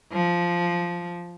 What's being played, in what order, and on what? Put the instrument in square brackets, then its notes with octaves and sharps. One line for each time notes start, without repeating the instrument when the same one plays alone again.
[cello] F3